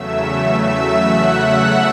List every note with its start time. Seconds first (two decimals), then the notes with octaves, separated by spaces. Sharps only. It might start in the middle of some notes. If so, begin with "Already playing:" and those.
Already playing: E2 C#3 F#3 A3 E5 E6
0.72 E5 E6
1.03 F#5 F#6
1.35 E5 E6